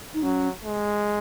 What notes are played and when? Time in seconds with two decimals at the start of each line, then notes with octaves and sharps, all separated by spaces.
0.14 D#4
0.23 F#3 C#4
0.64 G#3